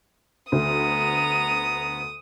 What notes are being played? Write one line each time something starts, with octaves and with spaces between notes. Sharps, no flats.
D2 B3 A#5 D#6